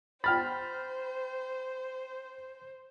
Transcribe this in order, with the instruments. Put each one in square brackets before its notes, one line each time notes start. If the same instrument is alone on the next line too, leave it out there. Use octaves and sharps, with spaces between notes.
[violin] C5 [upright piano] G5 F6 A6 [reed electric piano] B5